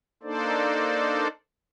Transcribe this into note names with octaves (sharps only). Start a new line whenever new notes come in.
A#3 D4 D#4 A4 C5 D5